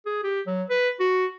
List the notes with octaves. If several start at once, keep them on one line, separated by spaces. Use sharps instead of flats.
G#4
G4
F#3
B4
F#4